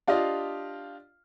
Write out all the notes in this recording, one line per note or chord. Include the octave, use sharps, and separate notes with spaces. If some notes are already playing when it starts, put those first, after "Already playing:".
D4 F4 G4 D#5 F5